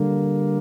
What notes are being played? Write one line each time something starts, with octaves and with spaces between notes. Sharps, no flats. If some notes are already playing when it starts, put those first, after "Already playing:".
Already playing: D3 G3 A#3